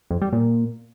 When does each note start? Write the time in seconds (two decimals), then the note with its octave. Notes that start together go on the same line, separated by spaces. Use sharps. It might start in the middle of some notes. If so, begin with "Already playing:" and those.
0.11 F2
0.22 G3
0.33 A#2